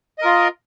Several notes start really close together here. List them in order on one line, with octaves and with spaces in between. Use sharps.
D#5 A#4 F4